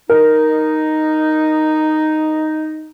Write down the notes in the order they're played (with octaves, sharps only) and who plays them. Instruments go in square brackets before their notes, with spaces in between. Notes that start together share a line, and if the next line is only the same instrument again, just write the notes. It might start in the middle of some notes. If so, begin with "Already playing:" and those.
[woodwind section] D#4 [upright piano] A#4